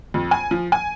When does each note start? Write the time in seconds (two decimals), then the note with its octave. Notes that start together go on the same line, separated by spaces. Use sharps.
0.14 F2
0.31 G#5
0.51 F3
0.72 G#5